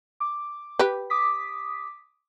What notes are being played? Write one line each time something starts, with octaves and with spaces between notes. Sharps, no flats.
D6
G4 B4
D6 D#6 B6